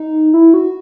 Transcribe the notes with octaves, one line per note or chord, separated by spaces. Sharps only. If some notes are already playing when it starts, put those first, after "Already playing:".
Already playing: D#4
E4
F#4